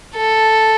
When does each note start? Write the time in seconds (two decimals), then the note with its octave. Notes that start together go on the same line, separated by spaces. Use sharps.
0.17 A4